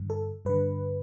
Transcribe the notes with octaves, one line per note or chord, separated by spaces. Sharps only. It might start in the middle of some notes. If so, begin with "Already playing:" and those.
Already playing: G2 D3
A4
G2 D3 B4